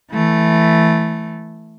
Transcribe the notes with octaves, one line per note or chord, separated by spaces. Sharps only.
E3 A3